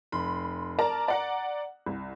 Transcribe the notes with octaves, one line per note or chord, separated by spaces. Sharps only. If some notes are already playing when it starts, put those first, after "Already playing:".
F1 B5 C6
A#4 D5 A5 A#5
D5 F#5 A#5
C2